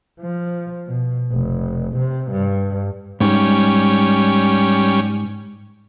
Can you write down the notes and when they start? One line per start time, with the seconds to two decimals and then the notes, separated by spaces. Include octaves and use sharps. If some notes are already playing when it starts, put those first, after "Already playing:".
0.21 F3
0.87 B2
1.32 F1
1.97 C3
2.32 G2
3.20 G#2 G3 C#4